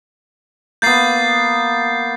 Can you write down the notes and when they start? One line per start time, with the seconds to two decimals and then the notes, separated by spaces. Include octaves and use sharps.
0.82 A#3 B3 G6 A6 C7